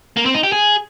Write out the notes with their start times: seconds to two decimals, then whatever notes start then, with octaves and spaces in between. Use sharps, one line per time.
0.17 A#3
0.26 C4
0.34 D#4
0.43 G4
0.52 G#4